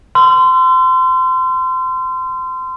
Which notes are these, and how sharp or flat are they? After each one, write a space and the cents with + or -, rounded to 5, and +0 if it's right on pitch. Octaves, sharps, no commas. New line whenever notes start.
C6 -25 E6 +40